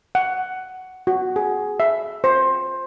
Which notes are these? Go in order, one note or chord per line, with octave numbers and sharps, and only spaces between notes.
F#5
F#4
G#4
E5
C5